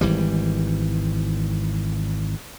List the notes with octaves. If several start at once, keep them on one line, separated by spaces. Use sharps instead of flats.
G#1 E3 G3